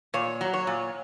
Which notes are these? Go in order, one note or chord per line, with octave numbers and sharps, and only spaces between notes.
A#2 C#5
F#3
C#5
A#2